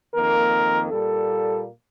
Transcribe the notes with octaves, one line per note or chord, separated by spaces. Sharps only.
F2 D#3 A#3 A#4
A#2 G3 A#3 A4